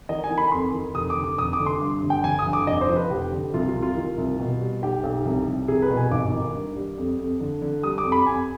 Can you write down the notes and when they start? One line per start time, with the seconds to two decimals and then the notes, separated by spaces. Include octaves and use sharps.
0.09 D#3 D#5
0.24 G#5
0.31 D#3
0.38 B5
0.52 F2 C6
0.73 D#3
0.95 F1 D#6
1.10 D6
1.16 D3
1.24 D6
1.38 F1 D#6
1.53 D6
1.59 D3
1.66 C6
1.81 G2
2.03 G1
2.10 G5
2.24 G1 G#5
2.39 D#6
2.46 G1
2.53 D6
2.67 F1 D#5
2.81 C5
2.89 F3
2.96 B4
3.10 F1 G4
3.32 D3
3.54 C2 F4
3.68 F4
3.75 C2
3.82 F4
3.96 D#3
4.18 C2
4.39 B2
4.61 G3
4.82 B1 G4
5.03 B1
5.25 C2
5.47 C2
5.68 C2 G#4
5.82 B4
5.90 B2
5.97 G#5
6.11 G#1 D6
6.33 D#3
6.54 G2
6.76 G3
6.98 F2
7.19 F2
7.40 D3
7.62 D3
7.83 G3 D#6
7.98 D6
8.05 F2
8.12 B5
8.26 F2 G#5